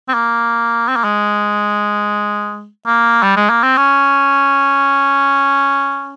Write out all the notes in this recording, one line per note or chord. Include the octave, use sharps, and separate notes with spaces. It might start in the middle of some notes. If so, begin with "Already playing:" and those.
C4
A#3
C4
A#3
G#3
A#3
G3
G#3
A#3
C4
C#4